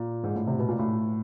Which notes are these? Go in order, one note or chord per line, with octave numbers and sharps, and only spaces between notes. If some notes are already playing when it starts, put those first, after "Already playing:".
Already playing: A#2
G#2
A2
C3
B2
A#2
A2